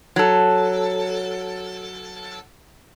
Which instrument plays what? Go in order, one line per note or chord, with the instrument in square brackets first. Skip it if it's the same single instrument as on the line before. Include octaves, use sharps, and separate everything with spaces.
[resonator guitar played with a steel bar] F#3 A4